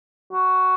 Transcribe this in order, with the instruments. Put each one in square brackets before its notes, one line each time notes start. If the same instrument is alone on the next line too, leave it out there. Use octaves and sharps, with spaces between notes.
[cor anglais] F#4